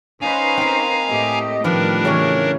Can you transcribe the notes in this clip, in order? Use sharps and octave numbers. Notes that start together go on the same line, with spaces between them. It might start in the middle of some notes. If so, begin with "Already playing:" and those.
C#4 D#4 B4 C5 F5 G#5 A#5
A#3 C4
A2 A3 G4 D#5
A2 D#3 F3 G3 D4 G4 A#4 B4
C#3 E3 D#4 C#5